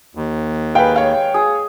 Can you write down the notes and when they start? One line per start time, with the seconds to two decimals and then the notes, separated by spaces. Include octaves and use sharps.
0.15 D#2
0.75 G#3 B4 F5 G5
0.96 C#5 F5
1.34 G#4